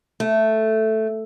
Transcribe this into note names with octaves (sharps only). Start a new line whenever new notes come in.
A3